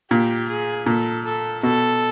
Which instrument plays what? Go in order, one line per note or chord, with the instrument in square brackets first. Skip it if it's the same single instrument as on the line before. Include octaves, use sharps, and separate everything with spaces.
[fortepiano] A#2 [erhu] G4
[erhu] G#4
[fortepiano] A#2 [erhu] A4
[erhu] A4
[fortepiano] B2 [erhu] A4